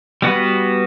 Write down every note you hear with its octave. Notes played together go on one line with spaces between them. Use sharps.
G3 B3 F#4 B4